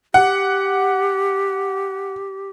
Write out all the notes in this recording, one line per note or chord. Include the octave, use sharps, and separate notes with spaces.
G4 F#5